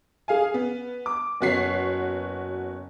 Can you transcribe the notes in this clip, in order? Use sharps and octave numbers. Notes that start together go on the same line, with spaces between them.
G#4 F5 G#5
B3
D6
F#1 B3 F#4 C#5 B6 C7